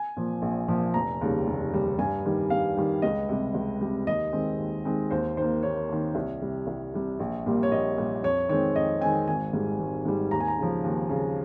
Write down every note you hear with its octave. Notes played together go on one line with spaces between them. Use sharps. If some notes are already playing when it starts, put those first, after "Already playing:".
Already playing: G#5
A#2 F3
A#1
A#2 F3
F1 A#5
D#2 C#3 G3
F1
D#2 C#3 G3
G2 G#5
D#3 G3
G2 F5
D#3 G3
C#2 D#5
C3 G3
C#2
C3 G3
D#2 D#5
D#3 G#3 C4
D#2
D#3 G#3 C4
D#2 C5
D#3 A#3 C5
D#2 C#5
D#3 A#3
C2
C3 G3
C2
C3 G3
A#1
A#2 G3 A#3
C#5
A#1 D#5
A#2 G3 A#3
F2 C#5
D#3 G#3 C4 C#5
F2 D#5
D#3 G#3 C4 G#5
G#1 G#5
G#2 G3
G#1
G#2 G3
D#2 A#5
G#5
A#5
C#3 F3
D#2
C#3 F3